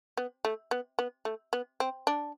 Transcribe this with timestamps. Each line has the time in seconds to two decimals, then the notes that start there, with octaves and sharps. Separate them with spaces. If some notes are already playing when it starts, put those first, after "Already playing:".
0.17 B3
0.45 A3
0.71 B3
0.99 B3
1.25 A3
1.53 B3
1.80 C4
2.07 D4